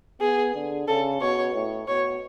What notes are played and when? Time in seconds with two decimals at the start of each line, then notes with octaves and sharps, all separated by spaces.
0.21 B3 G#4
0.54 D3
0.88 C#3 A4
1.21 B2 C#5
1.54 A2
1.88 B2 C#5